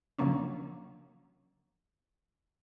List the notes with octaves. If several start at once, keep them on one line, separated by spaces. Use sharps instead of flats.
C#3 F3 F#3 A#3 C#4 D4